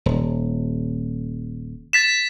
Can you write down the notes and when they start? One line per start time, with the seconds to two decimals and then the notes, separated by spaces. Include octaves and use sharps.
0.06 D#1
1.93 A6 B6 E7